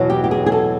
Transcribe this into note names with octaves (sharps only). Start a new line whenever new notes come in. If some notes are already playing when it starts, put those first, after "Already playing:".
Already playing: E2 B2 F#3
G4
G4
G#4
G#4
A4